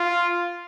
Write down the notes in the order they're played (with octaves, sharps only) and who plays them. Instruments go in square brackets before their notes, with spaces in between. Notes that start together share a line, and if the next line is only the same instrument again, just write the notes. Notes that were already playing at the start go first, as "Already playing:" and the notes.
Already playing: [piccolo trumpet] F4